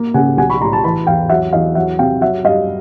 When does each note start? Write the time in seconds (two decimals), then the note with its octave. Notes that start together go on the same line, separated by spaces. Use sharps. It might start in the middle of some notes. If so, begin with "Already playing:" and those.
Already playing: A#3
0.14 C#3 F#5 G#5
0.37 B1 F#5 G#5
0.50 B5 C#6
0.60 A2 A#5 C6
0.72 A5 B5
0.84 E3 A5 B5
1.07 E2 F5 G5
1.30 F#3 E5 F#5
1.53 E2 D#5 F5
1.75 F#3 E5 F#5
1.99 C3 F5 G5
2.21 F#3 E5 F#5
2.45 G2 D#5 F5